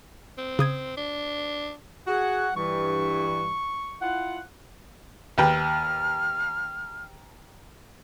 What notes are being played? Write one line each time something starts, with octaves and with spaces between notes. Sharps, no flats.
C4
C#3 D#6 G#6
D4
F#4 G#4 F#5
G2 E3 C#6
E4 F4 F#5
D#2 B4 G5 F6